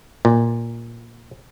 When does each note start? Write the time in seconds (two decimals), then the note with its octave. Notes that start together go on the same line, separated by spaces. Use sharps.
0.25 A#2